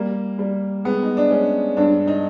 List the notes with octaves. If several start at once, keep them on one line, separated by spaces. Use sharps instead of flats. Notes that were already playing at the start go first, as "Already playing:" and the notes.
Already playing: G3 A#3
G3
G#3 B3
D#4
D4
G#3 C#4
G2 D4
D#4